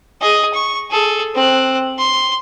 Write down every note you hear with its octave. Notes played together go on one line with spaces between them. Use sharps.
G#4 D#5
C#6
G#4 A4
C4 F#6
C6